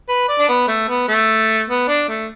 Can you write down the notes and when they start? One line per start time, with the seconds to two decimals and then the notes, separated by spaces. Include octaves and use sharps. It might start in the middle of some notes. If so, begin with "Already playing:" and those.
0.09 B4
0.28 D5
0.39 D4
0.49 B3
0.68 A3
0.89 B3
1.08 A3
1.68 B3
1.88 D4
2.08 A3